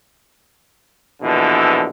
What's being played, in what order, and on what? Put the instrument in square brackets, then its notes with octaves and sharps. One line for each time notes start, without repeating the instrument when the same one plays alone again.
[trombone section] A#1 B2 D3 E3